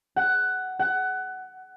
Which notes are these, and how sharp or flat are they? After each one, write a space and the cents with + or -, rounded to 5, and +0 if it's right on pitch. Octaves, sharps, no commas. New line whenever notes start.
F#5 +10
F#5 +20